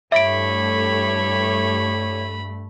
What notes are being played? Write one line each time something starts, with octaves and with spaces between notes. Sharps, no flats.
G2 A3 E4 G4 C#5 E5 B5 D7